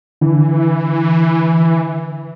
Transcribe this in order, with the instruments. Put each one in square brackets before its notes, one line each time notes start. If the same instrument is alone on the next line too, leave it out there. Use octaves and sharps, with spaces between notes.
[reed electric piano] D3 [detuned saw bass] E3